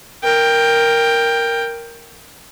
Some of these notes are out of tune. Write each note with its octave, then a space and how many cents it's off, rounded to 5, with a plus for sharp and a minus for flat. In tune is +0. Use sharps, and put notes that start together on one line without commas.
A#4 +0 G5 +15